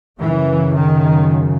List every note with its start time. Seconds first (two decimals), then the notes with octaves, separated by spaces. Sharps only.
0.21 F#2 C#3 E3
0.78 D#3